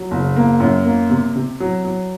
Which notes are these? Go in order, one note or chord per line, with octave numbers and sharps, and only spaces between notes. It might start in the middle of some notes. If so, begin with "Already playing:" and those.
Already playing: F#3
F#1
A#3
F#2
A#3
C3
C3
F#3
F#3